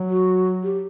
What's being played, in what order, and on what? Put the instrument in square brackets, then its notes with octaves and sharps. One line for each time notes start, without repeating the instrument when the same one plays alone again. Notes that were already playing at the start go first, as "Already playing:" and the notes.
Already playing: [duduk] F#3
[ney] F#4
G4